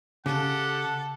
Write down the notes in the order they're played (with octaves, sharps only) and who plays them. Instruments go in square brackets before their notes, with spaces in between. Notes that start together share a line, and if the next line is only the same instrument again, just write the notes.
[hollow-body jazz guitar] C#3 [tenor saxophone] G4 [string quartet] A4 [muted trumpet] F#5